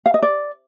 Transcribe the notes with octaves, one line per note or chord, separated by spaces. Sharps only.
F5
D#5
D5